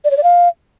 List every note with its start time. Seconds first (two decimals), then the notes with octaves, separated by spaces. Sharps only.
0.05 D5
0.11 C#5
0.17 D5
0.23 F5